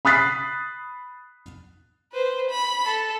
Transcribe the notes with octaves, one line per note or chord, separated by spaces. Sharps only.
B5 D#6 F#6 A6 B6 C7
B4 C5
B5
A4